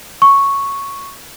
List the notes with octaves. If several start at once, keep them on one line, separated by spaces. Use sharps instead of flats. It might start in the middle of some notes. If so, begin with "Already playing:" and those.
C#6